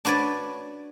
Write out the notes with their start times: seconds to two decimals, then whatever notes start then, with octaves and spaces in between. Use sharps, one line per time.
0.05 D4 F#4 B4 C#5 D5